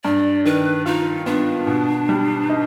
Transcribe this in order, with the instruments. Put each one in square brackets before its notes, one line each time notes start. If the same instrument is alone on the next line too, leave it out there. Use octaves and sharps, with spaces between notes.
[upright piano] G2 [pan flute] D5
[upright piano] D#3 [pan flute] B4
[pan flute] D#4 [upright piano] F4
[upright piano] B3 [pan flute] D4
[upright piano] B2
G3
D#4